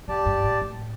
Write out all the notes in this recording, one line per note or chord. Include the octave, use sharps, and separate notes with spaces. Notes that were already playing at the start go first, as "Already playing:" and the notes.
F2 G4 D5 A5
G2
A2
A2